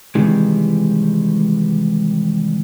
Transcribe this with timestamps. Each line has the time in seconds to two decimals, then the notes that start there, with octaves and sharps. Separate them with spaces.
0.15 C3 D#3 E3 G3 G#3